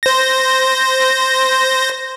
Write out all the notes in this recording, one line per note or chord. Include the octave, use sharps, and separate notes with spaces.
C5 A#6